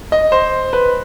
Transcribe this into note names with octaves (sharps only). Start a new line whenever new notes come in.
D#5
C5
B4